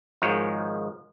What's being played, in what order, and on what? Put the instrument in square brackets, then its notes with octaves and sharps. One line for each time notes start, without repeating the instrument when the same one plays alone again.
[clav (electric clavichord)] G#1 G#2 D#3 F3 G#3 C#5